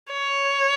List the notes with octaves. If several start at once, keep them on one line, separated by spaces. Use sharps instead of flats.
C#5